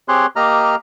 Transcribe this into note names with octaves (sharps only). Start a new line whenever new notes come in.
C4 G4 G#4 C#5 C6 F#6
A#3 G4 D#5 A#5 F6